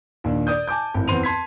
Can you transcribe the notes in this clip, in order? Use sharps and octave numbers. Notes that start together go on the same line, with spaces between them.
D#2 A#2 D4
D5 D#6 G6
G#5 A5 D6 G6
G#1 A2
E2 B3 C4 C6 D#7 F7
A5 C6 G#6 B6